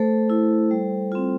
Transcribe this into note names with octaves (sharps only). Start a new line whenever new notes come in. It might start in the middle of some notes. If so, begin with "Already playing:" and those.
Already playing: A3 A4 C5
E4
G3
C4 F4